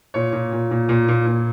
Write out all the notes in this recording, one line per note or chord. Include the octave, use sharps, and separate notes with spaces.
A#2 C#5
A#2
A#2
A#2
A#2
A#2
A#2